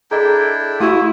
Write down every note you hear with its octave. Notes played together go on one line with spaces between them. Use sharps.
D4 E4 G#4 A4 D#5 G5 A#5
A3 E4 F#4 G4 F#5 C#6 D#6